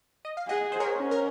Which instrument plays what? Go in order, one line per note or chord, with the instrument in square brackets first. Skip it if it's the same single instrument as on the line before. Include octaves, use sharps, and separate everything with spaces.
[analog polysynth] D#5
F5
[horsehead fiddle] G#4 [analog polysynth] D#5 F#5
[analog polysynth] C5
A#4 C#5
[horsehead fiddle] C#4
[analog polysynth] A#4